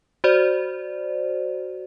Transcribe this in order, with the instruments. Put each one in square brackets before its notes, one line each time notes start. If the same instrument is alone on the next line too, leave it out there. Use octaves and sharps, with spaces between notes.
[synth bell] F#4 C5 D5